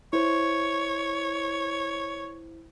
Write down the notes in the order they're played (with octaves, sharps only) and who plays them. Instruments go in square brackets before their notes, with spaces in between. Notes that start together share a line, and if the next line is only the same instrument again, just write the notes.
[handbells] E4 C5 [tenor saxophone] C#5